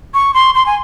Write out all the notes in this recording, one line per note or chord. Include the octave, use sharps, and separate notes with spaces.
C#6
C6
C6
G#5